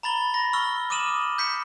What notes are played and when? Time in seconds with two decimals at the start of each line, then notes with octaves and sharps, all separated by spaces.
0.03 A#5 B5 A6 G7
0.34 B5 A#6
0.53 C#6 E6 F6 G7
0.90 D6 D#6 F6 D#7 E7 F#7
1.38 G6 B6 C#7